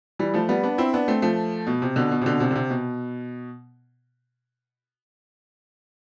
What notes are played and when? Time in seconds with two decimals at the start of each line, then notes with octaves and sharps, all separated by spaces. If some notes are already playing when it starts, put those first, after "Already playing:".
0.19 E3 G3
0.34 F3 A3
0.49 G3 B3
0.63 B3 D4
0.78 C4 E4
0.94 B3 D4
1.08 A3 C4
1.22 F3 A3
1.67 B2
1.82 C3
1.96 B2 D3
2.11 B2
2.22 C3
2.26 B2 D3
2.40 C3
2.51 D3
2.56 C3
2.70 B2